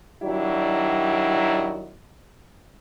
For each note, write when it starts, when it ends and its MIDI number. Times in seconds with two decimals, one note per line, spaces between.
0.23 1.94 51
0.23 1.94 54
0.23 1.94 55
0.23 1.94 62
0.23 1.94 64
0.23 1.94 66